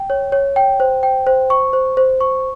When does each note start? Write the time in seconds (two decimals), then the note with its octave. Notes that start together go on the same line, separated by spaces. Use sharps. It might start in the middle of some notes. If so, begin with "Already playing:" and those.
Already playing: G5
0.10 C#5
0.32 C#5
0.56 G5
0.80 C5
1.03 G5
1.27 C5
1.50 C#6
1.73 C5
1.97 C5
2.21 C#6